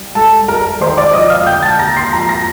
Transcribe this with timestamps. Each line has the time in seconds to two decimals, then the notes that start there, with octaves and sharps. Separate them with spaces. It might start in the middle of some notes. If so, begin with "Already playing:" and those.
Already playing: C2
0.15 G2 A4 A5
0.48 G1 A#4 A#5
0.81 D#3 C5 C6
0.97 D5 D6
1.13 F2 D#5 D#6
1.30 F5 F6
1.47 D3 G5 G6
1.63 A5 A6
1.79 D#2 A#5 A#6
1.97 C6 C7
2.12 F2 A#5 A#6
2.29 A#5 A#6